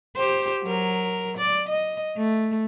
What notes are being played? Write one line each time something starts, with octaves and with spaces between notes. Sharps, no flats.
G4 C5
F#3 A#4
D5
D#5
A3